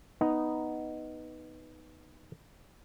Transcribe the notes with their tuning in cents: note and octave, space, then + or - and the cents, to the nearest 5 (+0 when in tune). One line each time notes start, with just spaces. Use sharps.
B3 +0 D#4 +0